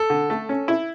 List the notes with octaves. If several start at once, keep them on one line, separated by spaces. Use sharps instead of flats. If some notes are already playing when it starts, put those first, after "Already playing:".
Already playing: A4
D3
A3
C#4
E4